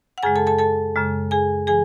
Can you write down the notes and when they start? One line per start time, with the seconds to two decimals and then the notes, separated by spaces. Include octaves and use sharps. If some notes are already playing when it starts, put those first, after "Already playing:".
0.18 F#5
0.23 F#2 C#3 G#3 G#4 G#5
0.36 A4 A5
0.47 A4 A5
0.59 A4 A5
0.96 F#2 C#3 G#3
1.31 G#4 G#5
1.67 E3 G#4 G#5